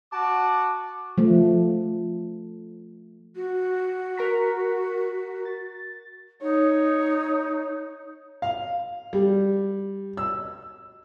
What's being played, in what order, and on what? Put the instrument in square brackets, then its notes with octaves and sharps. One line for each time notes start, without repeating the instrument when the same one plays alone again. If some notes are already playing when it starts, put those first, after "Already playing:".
[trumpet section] F#4 D6 [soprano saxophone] A5
[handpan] F3 A3
[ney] F#4
[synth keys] A#4 A#5 B6
A6
[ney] D#4 [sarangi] C#5
[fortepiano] F5
G3
E6